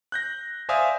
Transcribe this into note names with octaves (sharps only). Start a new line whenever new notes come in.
F#6 G6 A#6
C5 D5 E5 F5 G#5 D#6